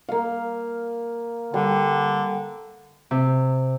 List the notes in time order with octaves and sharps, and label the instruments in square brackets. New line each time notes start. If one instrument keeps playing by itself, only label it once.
[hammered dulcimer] A#3 F5
[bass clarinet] D3 [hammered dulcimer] G3
[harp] C3